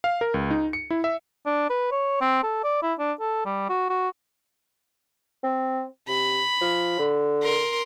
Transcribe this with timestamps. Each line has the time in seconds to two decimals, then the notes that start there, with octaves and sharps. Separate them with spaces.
0.04 F5
0.21 A#4
0.34 C#2
0.51 D#4
0.73 C#7
0.90 E4
1.04 E5
1.46 D4
1.70 B4
1.92 C#5
2.21 C4
2.43 A4
2.64 D5
2.82 E4
2.99 D4
3.21 A4
3.45 G3
3.69 F#4
3.90 F#4
5.44 C4
6.08 C3 B5
6.61 F3
6.99 D3
7.43 A#4 C6